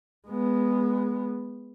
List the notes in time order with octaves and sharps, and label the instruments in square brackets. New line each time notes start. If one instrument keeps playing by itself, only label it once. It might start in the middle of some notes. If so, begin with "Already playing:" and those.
[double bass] G#3 B3